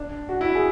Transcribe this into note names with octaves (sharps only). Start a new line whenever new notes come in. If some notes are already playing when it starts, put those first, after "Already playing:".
Already playing: D4
F#4
E4
G#4